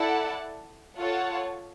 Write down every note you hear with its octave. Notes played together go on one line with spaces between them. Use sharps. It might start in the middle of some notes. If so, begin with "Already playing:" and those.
Already playing: E4 A4 D5 F#5 A5
F4 A4 C#5 F#5 A5